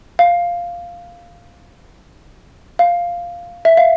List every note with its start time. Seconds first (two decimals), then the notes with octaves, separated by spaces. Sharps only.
0.19 F5
2.79 F5
3.65 E5
3.77 F5